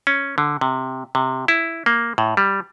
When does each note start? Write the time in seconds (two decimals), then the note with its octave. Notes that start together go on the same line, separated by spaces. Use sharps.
0.07 C#4
0.38 D3
0.61 C3
1.15 C3
1.48 E4
1.86 A#3
2.18 A2
2.37 G3